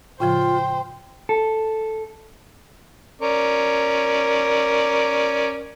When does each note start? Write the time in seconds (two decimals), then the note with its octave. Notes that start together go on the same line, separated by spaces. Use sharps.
0.20 A2 C#3 F3 F4 C5 G5
1.29 A4
3.22 C#4 A#4 D5